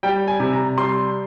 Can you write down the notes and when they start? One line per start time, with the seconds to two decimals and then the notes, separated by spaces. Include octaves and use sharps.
0.03 G3 G5
0.28 G#5
0.40 C3
0.53 A#5
0.78 G3 C6